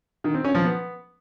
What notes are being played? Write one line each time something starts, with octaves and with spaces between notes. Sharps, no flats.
D#3
C4
C#4
F3
B3